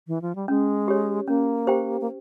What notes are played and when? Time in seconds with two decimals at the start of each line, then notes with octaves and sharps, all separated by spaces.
0.08 E3
0.22 F3
0.35 G3
0.48 G#3 C#4
0.88 G4 C#5
1.28 A#3 C#4
1.67 G4 C5 G5
2.01 A#3